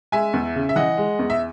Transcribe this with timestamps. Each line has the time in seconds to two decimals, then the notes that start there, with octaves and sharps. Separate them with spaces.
0.12 G#3 E5 G#5
0.33 E2
0.56 C#3
0.69 E5
0.76 E3 D#5 F#5
0.98 G#3
1.19 E2
1.30 E5